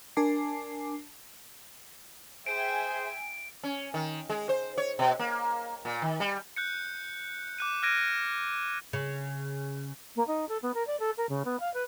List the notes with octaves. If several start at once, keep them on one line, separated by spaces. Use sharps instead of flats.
D4 A#4 G#5 A5 D6 C7
G#4 C5 E5 G5 G#5 D7
C#4
D#3
G#3
C5
C#5
B2
A#3
A#2
D#3
G3
F#6 G6 C#7
D6 F#6 D#7
F6 F#6 G#6 A#6 D7 D#7
C#3
A#3
D#4
A4
B3
A#4
D5
A4
A#4
C#3
B3
F5
B4